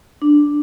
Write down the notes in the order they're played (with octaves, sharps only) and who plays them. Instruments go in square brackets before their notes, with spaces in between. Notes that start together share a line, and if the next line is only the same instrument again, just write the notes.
[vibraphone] D4